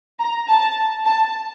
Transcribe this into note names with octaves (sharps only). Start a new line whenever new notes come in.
A#5
A5
A5